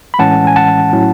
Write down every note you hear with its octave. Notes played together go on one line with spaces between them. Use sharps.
B5
A2 E3 G#3 C#4 F#5 A5
G#5
F#5 A5
A2 F#3 C#4 E4